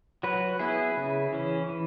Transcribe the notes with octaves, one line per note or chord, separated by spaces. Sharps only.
F#3 F#4 B4
B3 E4 G#4
C#3
E3 C#4
E3